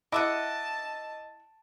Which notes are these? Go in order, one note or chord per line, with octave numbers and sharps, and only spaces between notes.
E4 D#5 E5 F#5 A5 D6 E6